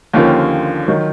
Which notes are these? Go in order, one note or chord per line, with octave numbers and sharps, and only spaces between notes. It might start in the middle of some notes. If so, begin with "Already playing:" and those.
D#2 D3 F3 A#3 C#4 F4 G4
D#3 F#3